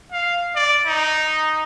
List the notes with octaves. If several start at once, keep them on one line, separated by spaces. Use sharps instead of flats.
F5
D5
D#4